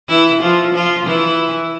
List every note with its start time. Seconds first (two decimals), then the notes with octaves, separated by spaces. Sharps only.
0.09 E3 E4
0.41 F3 F4
0.74 F3 F4
1.06 E3 E4